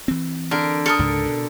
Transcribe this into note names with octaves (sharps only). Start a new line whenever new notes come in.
E3 C4
D3 A#4
A4 A#4 D#6
C#2 G#2 C#3
B2